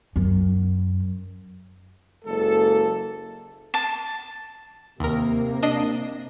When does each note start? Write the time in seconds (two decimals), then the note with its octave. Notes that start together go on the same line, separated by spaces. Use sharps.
0.16 F#2
2.25 F#1 G#3 A#3 A4
3.74 A5
5.00 D#2 C3 A#3 A#4
5.63 D4 D#5 C7